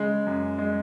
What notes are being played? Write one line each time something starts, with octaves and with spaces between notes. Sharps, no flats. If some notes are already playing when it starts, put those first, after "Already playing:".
Already playing: C#3 G#3
F#2
G#3